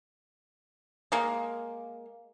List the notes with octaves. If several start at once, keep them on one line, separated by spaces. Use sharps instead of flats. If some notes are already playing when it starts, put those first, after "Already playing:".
G#3 A#3